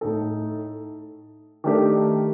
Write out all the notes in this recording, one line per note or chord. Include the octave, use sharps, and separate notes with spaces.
A2 A3 D#4 A4
D#3 A3 D4 G4 A#4